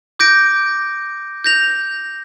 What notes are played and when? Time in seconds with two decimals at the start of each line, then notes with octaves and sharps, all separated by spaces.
0.19 D6 G6 A#6 D7
1.44 G6 A#6 F7